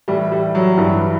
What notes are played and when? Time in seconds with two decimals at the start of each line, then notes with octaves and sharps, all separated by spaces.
0.08 A2 E3 G3
0.32 G3
0.55 F#3
0.77 G2 E3 G3